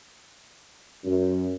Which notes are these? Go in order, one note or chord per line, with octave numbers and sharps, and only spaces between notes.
F#2